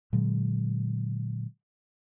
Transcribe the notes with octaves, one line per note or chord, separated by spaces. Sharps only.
A#2 D3 F#3 G#3